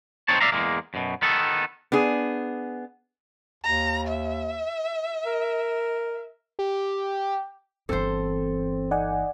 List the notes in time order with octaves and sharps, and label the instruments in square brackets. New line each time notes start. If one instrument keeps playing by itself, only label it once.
[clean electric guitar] C4 D#4 C5 C#5 A5
D5 E5 F5 A#5
E2 A#2 G#3 A#3
F#2 B2
D#3 B3 A4
[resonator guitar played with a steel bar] B3 D4 G#4
[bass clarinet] D#2 [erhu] A#5
[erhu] E5
[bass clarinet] A#4
[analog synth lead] G4
[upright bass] G1 E3 [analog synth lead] C4 [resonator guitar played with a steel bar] A4 C5
[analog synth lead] D#4 [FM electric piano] D5 F#5 G#5